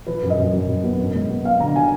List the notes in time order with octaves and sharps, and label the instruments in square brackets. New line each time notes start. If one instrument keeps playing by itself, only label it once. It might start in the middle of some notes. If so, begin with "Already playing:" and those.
[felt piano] F3 B4
F#2
D#5
F#2
F#2
F#2
B3
F#2
G#3
B3
B3 F5
D3 A#5
D3 G#5